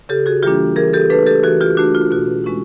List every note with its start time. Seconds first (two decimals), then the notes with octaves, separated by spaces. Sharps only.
0.09 C#3 G4 A4
0.26 F#4 G#4
0.43 E3 G3 A#3 D4 F4 G4
0.76 E3 G#4 A#4
0.93 G4 A4
1.10 A3 D4 A4 B4
1.26 G4 A4
1.43 E3 F#4 G#4
1.61 F4 G4
1.77 A3 D4 F#4
1.95 F4
2.11 B2 F#4
2.44 G#3 C#4 E4